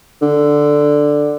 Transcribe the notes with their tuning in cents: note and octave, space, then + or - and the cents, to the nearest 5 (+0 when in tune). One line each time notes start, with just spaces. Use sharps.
D3 +5